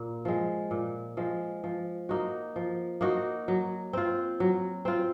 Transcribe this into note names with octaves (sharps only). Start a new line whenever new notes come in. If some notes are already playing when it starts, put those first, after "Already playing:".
Already playing: A#2
F3 G#3
A#2
F3 G#3
F3
A#3 D#4 F#4
F3
A#3 D#4 F#4
F#3
C4 F4
F#3
C4 F4